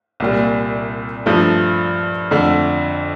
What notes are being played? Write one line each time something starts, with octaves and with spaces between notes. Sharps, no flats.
C2 A#2 G3
G2 F3 A3
F2 D3 A3